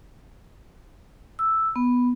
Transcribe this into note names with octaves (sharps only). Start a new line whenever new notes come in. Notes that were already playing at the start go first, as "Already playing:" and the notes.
E6
B3